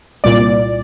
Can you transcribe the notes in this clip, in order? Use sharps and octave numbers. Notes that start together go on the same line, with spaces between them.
C2 A#2 D5